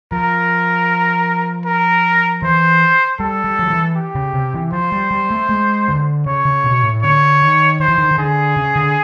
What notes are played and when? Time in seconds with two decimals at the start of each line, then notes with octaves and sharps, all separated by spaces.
0.12 F3 A#4
1.65 A#4
2.43 E3 C5
3.20 G3 A4
3.45 G3
3.59 F3
3.70 E3
3.96 G4
4.15 C#3
4.34 C3
4.54 E3
4.73 F3 C5
4.92 G3
5.11 G3
5.31 A3
5.49 G#3
5.88 D3
6.26 C#3 C#5
6.45 C#3
6.64 B2
6.84 A2
7.03 D3 C#5
7.42 D#3
7.80 D#3 C5
7.89 E3
7.98 D#3
8.11 D#3
8.18 D3 G#4
8.57 C#3
8.76 D3